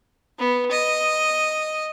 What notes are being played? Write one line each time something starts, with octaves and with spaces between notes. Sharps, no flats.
B3
D#5